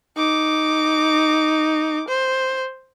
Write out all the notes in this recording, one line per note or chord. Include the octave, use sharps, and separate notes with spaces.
D#4 D6
C5